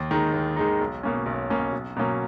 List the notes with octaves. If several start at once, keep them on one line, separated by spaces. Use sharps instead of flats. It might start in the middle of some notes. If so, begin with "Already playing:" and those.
Already playing: D#2
D#3 G#3 D#4
D#2
D#3 G#3 D#4
B1
B2 A#3 C#4
B1
B2 A#3 C#4
B1
B2 F#3 A#3 C#4